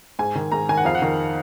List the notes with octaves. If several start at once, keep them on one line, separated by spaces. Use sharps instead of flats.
G#2 G#5
D#3
G#2 A#5
D#3 G#5
F#5
F2 F5
F#5
D#3